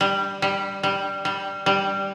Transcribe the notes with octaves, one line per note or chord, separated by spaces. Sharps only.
G3
G3
G3
G3
G3